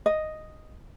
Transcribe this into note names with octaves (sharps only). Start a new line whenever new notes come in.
D#5